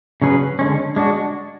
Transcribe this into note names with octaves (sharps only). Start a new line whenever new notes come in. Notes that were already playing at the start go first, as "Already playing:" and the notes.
C#3 F#3 C#4 G#4 B4
D3 G#3 C#4
G#3 D4 F#4